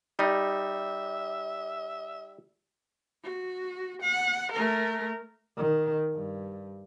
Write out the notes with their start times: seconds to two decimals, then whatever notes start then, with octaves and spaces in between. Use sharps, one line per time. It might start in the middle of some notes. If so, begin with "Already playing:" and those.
0.19 G3 D#4 E5
3.24 F#4
4.02 F#5
4.52 A3 A#4
5.57 D#3
6.13 G2